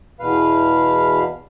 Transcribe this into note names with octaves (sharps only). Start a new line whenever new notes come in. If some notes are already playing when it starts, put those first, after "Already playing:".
E2 B2 B4 F5